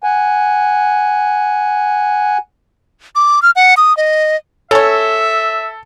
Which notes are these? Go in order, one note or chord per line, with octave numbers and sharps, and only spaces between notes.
F#5 G#5
D6
F6
F#5
D#6
D#5
C#4 A4 C#5 E5